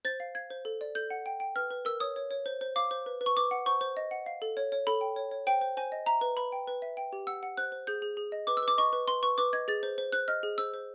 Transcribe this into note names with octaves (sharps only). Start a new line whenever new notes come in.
C5 A6
F5
F5 G#6
C5
A4
D5
A4 G6
F#5
G5
G5
B4 F6
B4
A#4 E6
C#5 D#6
C#5
C#5
C5
C5
F5 D6
C5
B4
B4
C#6
B4 D6
F#5
C5 C#6
C5
D#5
F#5
F5
A4
C#5
C#5
A4 B5
G5
C#5
C#5
C5 G5
C5
C5 G#5
D#5
E5 A#5
B4
B4 B5
G5
B4
E5
G5
G4
F#5 E6
F#5
C5 F#6
C5
G#4 G6
G#4
G#4
D#5
B4 D6
E6
B4
D6
D#5 C#6
B4
B4 C6
B4 C#6
B4 D6
D#5 G#6
G#4 A6
C5
C5
C5 F#6
D#5 F6
G#4
C5 E6
C5